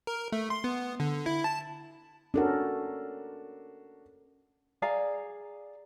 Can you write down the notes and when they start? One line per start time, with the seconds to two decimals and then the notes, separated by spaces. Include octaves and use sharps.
0.07 A#4
0.32 A3
0.50 C6
0.64 B3
1.00 D3
1.26 E4
1.44 A5
2.34 C#4 D4 F#4 A4 A#4
4.82 G#4 D5 F5 A#5